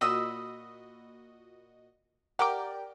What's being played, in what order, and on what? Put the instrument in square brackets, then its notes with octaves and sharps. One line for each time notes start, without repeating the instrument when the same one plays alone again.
[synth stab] A#2 F#4 D#5 [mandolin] B5 D#6 E6
[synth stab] G4 A#4 G5 [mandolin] D5 [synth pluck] F#5 D6